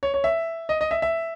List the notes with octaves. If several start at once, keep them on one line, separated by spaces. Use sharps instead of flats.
C#5
C#5
E5
D#5
D#5
E5
E5